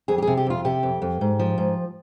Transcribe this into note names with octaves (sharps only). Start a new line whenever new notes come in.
F2 G#4
G4
G#4
C3
G4
F2 F4
C3 G4
F2
F2
G#2
F3
G#2